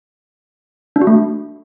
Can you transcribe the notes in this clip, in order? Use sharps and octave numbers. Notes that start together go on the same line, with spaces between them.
D4
F#4
A3